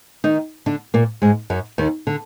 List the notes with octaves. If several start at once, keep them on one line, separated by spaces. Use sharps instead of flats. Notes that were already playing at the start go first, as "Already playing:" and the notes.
D#3 D#4
D3 D4
A#2 A#3
G#2 G#3
F#2 F#3
D#2 D#3
D3